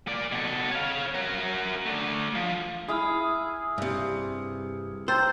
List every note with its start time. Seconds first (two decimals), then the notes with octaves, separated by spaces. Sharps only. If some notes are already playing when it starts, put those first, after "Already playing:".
0.07 A#3 D5
0.32 B2 A4
0.71 C#5 F5
1.14 F#4 A#4
1.86 A3 D4
2.35 F3
2.88 E4 G#4 B5 D#6 F6
3.78 G2 C3
5.08 C5 G5 A#5 E6 G6 A6